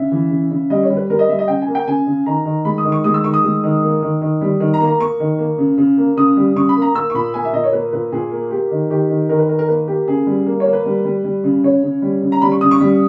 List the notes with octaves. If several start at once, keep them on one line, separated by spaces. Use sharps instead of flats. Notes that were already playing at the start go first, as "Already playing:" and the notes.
Already playing: C#3 E5
E3
C#3
C#3
G3 D#5
C#5
G3
B4
G3 A#4
D#5
G3 E5
D#5
C#3 G5
G#5
A#3
G5
C#3 G#5
C#3
D#3 A#5
D#3
G#3 B5
D#6
D#3
C#6
G#3 D#6
E6
D#3 C#6
D#6
G#3
D#3
A#3
D#3
D#3
G3
D#3
A#5
A#3
A#5
A#3 C#6
D#3
A#3
C#3
C#3
A#3
C#3 D#6
G3
C#3 C#6
B5
A#3
A#5
A#3 E6
C#6
A#2 B5
A#3 G#5
E5
A#2 D#5
C#5
A#3 B4
A#2 B4
A#2 G#4
A#3
A#3 G4
D#3
D#3 G4
D#3
D#3 A#4
B4
D#3 A#4
A#4
A#3 B4
A#3 G4
C#3 G#4
G3
A#3
C#5
A#3
B4
G3
G3
G3
C#3
C#3 C#5
C#3
G3
C#3
A#5
G3 B5
C#6
C#3 D#6
C#6
G3